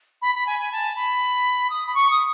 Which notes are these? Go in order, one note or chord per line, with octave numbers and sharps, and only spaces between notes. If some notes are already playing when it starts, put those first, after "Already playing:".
B5
B5
G#5
G#5
A5
B5
D#6
B5
C#6
D#6